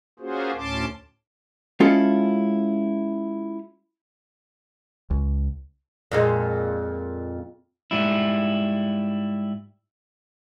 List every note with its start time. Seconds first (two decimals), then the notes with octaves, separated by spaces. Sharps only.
0.20 A#3 C#4 F4 F#4 G#4 C5
0.56 D2 A2 C#4 A5 C6 D6
1.80 G#3 C#4 E4 F4 A4
5.11 C#2
6.12 F2 A#2 G#3
7.91 G#2 G3 E4